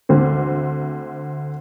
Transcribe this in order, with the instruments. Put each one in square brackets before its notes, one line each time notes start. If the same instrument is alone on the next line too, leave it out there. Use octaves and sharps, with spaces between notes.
[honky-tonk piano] D2 D3 C4